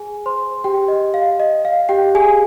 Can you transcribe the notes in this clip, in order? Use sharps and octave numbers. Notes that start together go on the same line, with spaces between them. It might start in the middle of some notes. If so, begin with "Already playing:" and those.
Already playing: G#4 G#5
C5 C6
G4 G5
D#5
F5
D#5
F5
G4 G5
G#4 G#5